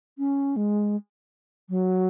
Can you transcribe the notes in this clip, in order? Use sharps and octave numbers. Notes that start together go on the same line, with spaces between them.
C#4
G#3
F#3